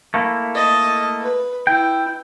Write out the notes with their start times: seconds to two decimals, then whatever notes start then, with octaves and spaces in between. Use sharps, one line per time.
0.14 A3 A#3 E4
0.55 D#5 A5
1.21 B4
1.67 E4 G5